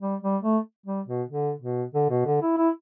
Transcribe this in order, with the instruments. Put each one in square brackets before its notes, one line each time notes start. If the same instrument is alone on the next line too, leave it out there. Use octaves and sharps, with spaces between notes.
[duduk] G3
G3
A3
G3
B2
D3
B2
D3
B2
D3
E4
E4